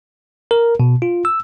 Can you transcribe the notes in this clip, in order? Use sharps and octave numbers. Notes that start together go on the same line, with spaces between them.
A#4
B2
F4
E6